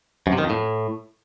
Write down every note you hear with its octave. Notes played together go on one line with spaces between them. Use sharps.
F#2
C3
D#3
F2
A2